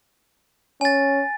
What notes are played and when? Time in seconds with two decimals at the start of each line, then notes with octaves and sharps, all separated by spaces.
0.81 C#4 G#5 A6